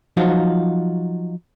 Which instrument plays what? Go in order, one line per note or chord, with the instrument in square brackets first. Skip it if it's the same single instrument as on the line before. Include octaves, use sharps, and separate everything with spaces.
[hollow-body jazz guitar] F3 F#3 D#4 F4 F#4